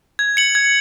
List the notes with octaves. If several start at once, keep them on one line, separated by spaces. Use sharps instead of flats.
G#6
C#7 F#7
G#6